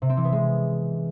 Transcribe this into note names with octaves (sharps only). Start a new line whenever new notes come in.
C3
C4
E3
B3
G#3